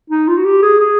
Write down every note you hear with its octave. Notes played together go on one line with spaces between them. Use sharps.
D#4
F4
F#4
G4
G#4
G#4